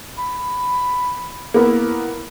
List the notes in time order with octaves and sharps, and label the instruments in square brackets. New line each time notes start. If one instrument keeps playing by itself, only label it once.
[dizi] B5
[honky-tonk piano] A#3 B3 [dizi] E4